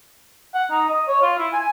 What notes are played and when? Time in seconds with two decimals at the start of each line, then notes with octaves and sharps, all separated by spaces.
0.54 F#5
0.71 D#4
0.89 D#5
1.08 C#5
1.23 F4
1.39 E4
1.53 G#5